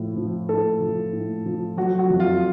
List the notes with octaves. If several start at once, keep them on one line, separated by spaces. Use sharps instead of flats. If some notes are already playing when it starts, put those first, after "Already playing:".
Already playing: A2 F3
F3
A2 A4
F3
A2
F3
F#3 F#4
F#4
F2
F4